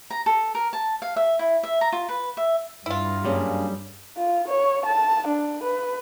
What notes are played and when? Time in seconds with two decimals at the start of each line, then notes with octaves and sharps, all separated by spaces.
0.10 A#5
0.26 A4
0.55 A#4
0.73 A5
1.02 F5
1.16 E5
1.39 E4
1.63 E5
1.81 A#5
1.93 F4
2.09 B4
2.37 E5
2.86 G2 E4 F4
3.25 F#3 G3 A#3 C#4 D4 G#4
4.17 F4
4.48 C#5
4.86 A5
5.27 D4
5.63 B4